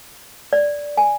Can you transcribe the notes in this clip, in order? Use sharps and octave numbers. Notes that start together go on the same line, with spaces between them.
D5
G#5